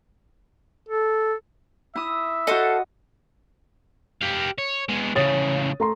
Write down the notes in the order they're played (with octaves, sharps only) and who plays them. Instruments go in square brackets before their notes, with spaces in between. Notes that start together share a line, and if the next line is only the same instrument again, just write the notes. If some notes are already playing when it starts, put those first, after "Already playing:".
[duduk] A4
[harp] E4 D#6 [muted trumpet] E5
[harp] F#4 D#5 [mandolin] A4 C5 F5
[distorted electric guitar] G4 F5
C#5
G#3 B3
[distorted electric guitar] A2 C#3 [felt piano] C#5 D#6 A6
[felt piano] A3 A#5 C6